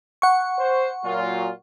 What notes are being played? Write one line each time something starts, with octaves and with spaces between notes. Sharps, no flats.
F#5 C#6
C5
A#2 F#3 F4